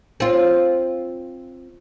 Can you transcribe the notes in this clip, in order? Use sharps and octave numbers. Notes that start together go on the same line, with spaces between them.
C4 F4